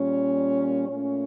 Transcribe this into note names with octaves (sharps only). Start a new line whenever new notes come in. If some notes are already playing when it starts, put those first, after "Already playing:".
Already playing: A#2 G3 A#3 C#4
A#2 A3 C#4